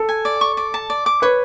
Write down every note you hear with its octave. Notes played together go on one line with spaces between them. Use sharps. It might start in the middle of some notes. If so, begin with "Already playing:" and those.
Already playing: A4
G#5
D5
C#6
D5
A5
D5
D6
B4 C#5